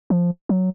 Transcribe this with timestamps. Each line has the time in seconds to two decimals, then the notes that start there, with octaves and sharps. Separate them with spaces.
0.10 F3
0.49 F#3